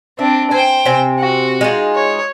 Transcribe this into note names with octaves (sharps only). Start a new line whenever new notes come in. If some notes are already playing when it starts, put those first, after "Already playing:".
C4 D4 E5
C5 G5 G#5
C3 C4 G#5
F#4
G#3 D#4 F4
C#5